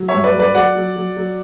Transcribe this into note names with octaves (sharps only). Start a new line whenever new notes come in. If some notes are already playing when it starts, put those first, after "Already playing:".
Already playing: F#3
C#5 E5
G2
B4 D5
F#3
B4 D5
F#3 D5 F#5
F#3
F#3
F#3